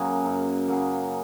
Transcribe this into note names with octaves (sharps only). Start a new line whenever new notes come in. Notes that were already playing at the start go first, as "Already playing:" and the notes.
Already playing: F#2 C#3 F#3 A#3
F#2
C#3 F#3 A#3